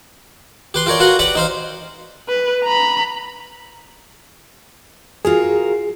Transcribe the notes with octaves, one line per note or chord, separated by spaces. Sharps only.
G4 B4 C6
F4 G4 A#4 C#5 D5
F4 F#4 A#4 B4 F#5
G4 B4 D5 F#5 B5
D#4 C5 F5
B4
A#5 B5
F4 F#4 G#4 A#4